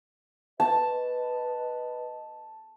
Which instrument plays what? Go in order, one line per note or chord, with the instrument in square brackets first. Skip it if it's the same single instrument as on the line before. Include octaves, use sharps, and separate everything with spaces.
[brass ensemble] B4 D#5 [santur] A5